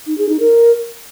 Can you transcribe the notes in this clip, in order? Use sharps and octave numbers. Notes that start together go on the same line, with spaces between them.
D#4
G#4
D#4
A#4